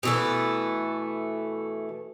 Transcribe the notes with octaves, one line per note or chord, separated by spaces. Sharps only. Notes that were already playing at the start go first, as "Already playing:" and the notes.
B2 E3 A3